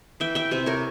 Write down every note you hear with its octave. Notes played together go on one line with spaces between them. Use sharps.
E3 E5 G5
E5 G5
C3 C5 E5
A#4 C#5